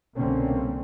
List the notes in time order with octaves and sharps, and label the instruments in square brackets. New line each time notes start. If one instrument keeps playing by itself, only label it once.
[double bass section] C2 B2 D3 A#3 C4 C#4